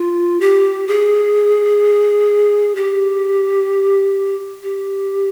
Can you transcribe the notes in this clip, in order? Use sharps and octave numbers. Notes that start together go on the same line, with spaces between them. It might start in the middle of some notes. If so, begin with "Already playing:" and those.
Already playing: F4
G4
G#4
G4
G4